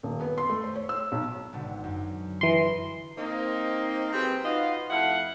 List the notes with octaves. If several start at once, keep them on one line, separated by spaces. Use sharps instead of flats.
D#1
B3
C6
A3
C5
C#5
E6
B1
G#1 B2 D3
F#2
E3 B4 D#5 A#5 C6
A#3 C4 D#4
F#3 C4 G4 G#4 B4
D#4 F4 F#4 B4 D#5 F5
F2 A3 E4 F5 F#5